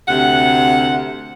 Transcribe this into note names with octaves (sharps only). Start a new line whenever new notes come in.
D2 C3 F#5